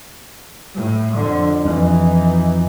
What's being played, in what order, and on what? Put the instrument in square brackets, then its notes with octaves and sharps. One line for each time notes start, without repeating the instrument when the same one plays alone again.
[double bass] A2
F2 D3
[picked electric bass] F2 [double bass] E3 D#4